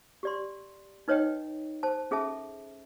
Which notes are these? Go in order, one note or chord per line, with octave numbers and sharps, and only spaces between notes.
G4 D5 C6
D#4 B4 C#5 D#5 G5
C5 A5
C#4 G#4 A4 E5 A5